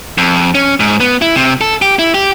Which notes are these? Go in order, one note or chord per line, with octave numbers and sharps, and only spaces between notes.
F2
C#4
G#2
B3
E4
C3
A4
G4
E4
G4